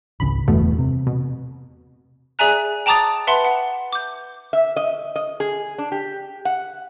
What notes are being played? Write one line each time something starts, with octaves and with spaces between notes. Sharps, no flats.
G#1 C#2 C#3 B5
F#1 E2 G2 B2 A3
C3
B2
G#4 D5 E5 G#5 A#5 F#6
G5 A5 A#5 D6 D#6 A6
B4 E5 F#5 A5 B5 C6
F#5
D6 G6
E5
D#5
D#5
G#4
D4
G4
F#5